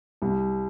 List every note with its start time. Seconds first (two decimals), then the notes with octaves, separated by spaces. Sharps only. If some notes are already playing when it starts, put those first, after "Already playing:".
0.22 C2